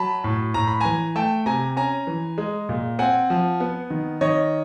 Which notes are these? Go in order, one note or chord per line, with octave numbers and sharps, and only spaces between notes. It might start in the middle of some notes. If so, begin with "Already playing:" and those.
Already playing: F#3 A5 B5
A2
A2 A#5
B5
E3 G#5 A#5
A3 G5 A5
C3 G#5 A#5
C#4 G#5 A#5
E3
G#3
A#2
C4 F#5 G#5
F3
B3
D#3
D#3 C#5 D#5